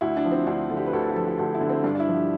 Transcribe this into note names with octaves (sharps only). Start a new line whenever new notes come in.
D2 E4
D4
F3
C4
D2 D4
D3
G4
B4
D2 A4
A4
G4
F3 A4
G4
D2 A4
E4
D3
C4
G2 D4
D4
E4
F3
G4